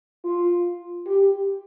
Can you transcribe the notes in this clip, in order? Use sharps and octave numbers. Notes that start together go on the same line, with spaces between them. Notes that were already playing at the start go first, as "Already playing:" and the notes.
F4
G4